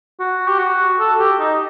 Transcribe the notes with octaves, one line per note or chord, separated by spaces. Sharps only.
F#4
G4
F#4
A4
G4
D#4